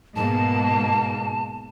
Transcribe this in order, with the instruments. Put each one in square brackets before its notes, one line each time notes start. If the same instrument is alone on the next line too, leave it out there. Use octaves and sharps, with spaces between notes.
[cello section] G#2 B2 A#3 [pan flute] A5